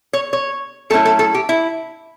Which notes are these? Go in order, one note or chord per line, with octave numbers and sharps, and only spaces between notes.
C#5
C#5
F#3 A3 C#4 E4 A4
A4
A4
G4
E4